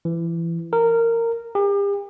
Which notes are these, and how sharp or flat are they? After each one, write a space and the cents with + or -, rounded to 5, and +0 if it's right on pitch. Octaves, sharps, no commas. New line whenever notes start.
E3 +25
A#4 -15
G4 +40